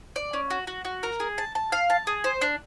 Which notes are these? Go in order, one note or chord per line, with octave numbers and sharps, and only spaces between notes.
D5
C#4
F#4
F#4
F#4
A#4
G#4
A5
A5
F5
A5
G#4
C5
D4